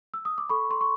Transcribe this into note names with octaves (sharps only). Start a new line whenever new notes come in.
E6
D#6
D6
A4 B5 C#6
A4 C6
C#6